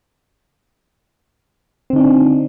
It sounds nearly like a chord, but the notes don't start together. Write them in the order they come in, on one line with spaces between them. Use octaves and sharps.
C4 D3 D#4 D4